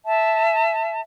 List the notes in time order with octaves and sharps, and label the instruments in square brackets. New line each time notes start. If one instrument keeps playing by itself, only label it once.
[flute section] E5 A5